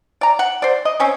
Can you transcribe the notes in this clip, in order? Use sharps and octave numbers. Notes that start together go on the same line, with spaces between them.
D5 A#5
F#5
C5 D5
D#5
C4 C#4 C#5